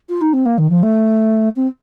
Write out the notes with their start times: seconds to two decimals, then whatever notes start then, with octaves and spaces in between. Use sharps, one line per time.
0.09 F4
0.21 D#4
0.33 C4
0.46 A#3
0.58 D#3
0.70 F3
0.83 A3
1.56 C4